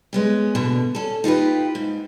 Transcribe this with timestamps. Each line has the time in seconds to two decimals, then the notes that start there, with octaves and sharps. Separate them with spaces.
0.13 G#3 B3 C#4
0.55 B2 D3
0.95 C#4 A4
1.24 D#4 F4 G4 B4
1.75 G#2